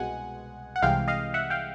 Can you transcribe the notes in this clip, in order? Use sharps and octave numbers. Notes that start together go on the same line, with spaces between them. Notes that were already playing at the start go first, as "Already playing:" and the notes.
Already playing: C2 B2 G#3 F#5 G#5
F#5
C2 C3 E3 G#3 F5 G5
D#5 F5
E5 F#5
F5 G5